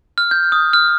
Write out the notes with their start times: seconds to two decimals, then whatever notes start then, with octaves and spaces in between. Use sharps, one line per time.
0.18 F6
0.31 G6
0.52 D#6
0.73 F6